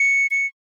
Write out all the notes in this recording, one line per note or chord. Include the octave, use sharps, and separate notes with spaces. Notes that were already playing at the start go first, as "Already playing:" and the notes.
Already playing: C#7
C#7